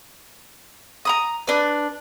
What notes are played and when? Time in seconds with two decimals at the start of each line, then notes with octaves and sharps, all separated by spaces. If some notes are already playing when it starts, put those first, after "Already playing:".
1.05 A#5 B5 D#6
1.47 D4 B4